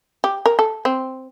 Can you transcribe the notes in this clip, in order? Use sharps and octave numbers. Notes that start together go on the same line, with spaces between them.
G4
A#4
A4
C4